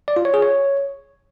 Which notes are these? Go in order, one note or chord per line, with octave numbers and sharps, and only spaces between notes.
D5
F4
C#5
G#4
C#5